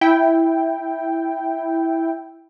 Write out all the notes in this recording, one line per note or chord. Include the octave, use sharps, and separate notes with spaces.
E4 G5